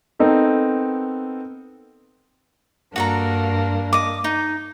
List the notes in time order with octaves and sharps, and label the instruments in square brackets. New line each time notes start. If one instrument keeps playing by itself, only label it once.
[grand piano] B3 C4 D#4 A4 A#4
[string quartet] G2 A#3 D4 [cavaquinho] F#4 A4 A#5
[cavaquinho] D#5 D6
D#4